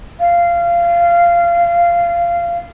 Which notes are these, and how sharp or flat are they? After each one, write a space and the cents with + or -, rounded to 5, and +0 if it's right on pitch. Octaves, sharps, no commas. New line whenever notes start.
F5 -20